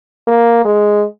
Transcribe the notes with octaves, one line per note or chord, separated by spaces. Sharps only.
A#3
G#3